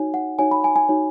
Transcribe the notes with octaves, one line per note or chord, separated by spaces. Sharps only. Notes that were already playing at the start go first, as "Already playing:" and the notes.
Already playing: D#4 F#4 C#5 G#5
F#5
D#4 F#4 C#5 G#5
B5
G#5
G#5
D#4 F#4 C#5